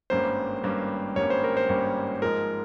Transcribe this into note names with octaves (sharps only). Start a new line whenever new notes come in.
G#1 G2 G3 A#3 C#4 C5
G#1 G2 G3 A#3 C#4
G#1 G2 G3 A#3 C#4 C#5
C5
A#4
C5
G#1 G2 G3 A#3 C#4
G#2 F3 G#3 A#4